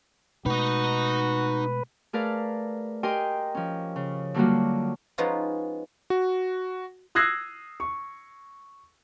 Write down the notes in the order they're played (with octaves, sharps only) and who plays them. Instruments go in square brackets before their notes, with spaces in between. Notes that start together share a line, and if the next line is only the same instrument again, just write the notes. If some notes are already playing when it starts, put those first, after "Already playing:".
[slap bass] B2 G#3 A3 [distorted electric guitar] D#4 D#5 [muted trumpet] F#4 [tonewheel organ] B4
[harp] A3 G#4 A#4 B4 D5 F5
G4 A#4 D#5 G5 G#5 C6
F3 C#4
C#3
D3 F#3 G3 A#3 F4 F#4
[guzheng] F3 G#3 B3 C#4 D#4 F4
[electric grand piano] F#4
[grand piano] D#6 E6 F#6 G#6 A#6 C7
C#6